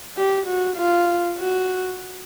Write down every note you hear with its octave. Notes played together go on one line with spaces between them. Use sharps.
G4
F#4
F4
F#4